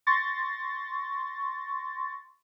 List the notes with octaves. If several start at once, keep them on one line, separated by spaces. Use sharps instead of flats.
C6 C#6 A6 A#6